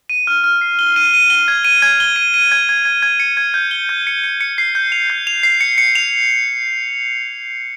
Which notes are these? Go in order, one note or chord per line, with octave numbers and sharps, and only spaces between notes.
D#7
F6
F6
C7
G7
D#7
D#7
G7
G#6
D#7
G#6
G7
D#7
D#7
G#6
G#6
G#6
G#6
C#7
G#6
G6
G7
G6
C#7
C#7
C#7
C7
G6
F7
G6
F7
C7
C#7
C#7
F7